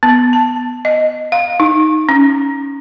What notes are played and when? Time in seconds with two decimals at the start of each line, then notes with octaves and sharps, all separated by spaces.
0.03 B3
0.33 A5
0.85 D#5
1.32 F5
1.60 D#4
2.09 C#4